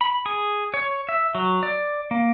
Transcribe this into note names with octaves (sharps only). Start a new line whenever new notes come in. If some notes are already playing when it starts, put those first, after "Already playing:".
B5
G#4
C#5
E5
F#3
D5
A#3